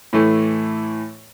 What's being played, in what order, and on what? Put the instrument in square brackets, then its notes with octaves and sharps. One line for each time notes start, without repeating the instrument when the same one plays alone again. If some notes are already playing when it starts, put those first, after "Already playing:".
[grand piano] A2 E3 A3